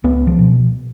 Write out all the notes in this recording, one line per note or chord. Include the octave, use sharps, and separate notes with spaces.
C#2 B3
F3
B2